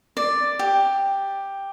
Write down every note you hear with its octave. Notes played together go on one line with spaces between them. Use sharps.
D5
G4